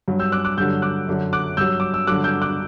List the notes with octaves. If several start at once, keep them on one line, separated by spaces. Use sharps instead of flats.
G2 F#3
E6 G6
D6 F#6
D6 F#6
G2 D3 F#3 E6 G6
D6 F#6
F#2 D3 F#3
D6 F#6
G2 F#3 E6 G6
D6
E6
G2 D3 F#3 D6 F#6
E6 G6
D6 F#6